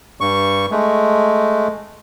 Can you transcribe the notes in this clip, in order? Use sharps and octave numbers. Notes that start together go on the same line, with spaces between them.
G2 C#6
G#3 A3